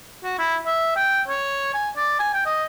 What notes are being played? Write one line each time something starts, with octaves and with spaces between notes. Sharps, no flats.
F#4
E4
E5
G5
C#5
G#5
D5
G#5
G5
D#5